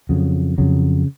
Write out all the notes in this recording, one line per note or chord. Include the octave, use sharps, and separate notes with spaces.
F2 C#3 F#3
F2 C#3 F#3